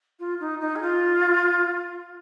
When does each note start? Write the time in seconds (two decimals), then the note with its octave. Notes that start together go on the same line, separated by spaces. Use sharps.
0.19 F4
0.40 D#4
0.61 D#4
0.75 G#4
0.82 F4